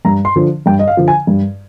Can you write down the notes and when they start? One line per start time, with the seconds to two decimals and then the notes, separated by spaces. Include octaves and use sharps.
0.05 G2 A#5
0.25 C6
0.36 D3 F3
0.66 G2 G5
0.79 D#5
0.88 F5
0.97 D3 F3
1.08 G#5
1.27 G2